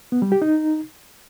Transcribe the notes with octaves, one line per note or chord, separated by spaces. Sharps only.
B3
G3
G4
D#4